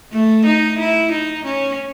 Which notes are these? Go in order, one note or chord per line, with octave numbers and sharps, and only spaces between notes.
A3
D#4
E4
D#4
C#4